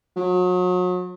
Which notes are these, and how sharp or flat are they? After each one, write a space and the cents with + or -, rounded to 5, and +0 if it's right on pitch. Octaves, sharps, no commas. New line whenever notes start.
F#3 -35